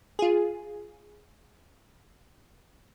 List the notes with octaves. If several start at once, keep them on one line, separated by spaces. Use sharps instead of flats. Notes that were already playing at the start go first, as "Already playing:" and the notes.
F4 G#4